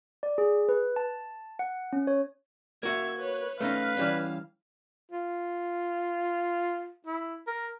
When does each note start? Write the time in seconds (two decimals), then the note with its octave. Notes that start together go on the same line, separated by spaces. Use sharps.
0.23 D5
0.38 G#4
0.69 B4
0.96 A5
1.59 F#5
1.93 C#4
2.07 C#5
2.83 A#3 F#4 E5 G#6
3.18 B4 C#5
3.61 A3 C#4 D#4 B4 F5
3.97 E3 G3 C#4
5.11 F4
7.06 E4
7.47 A#4